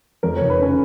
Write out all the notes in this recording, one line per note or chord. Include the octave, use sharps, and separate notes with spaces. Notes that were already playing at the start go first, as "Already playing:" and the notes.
F2 A#4
F1 C#5
B4
C#3 C#4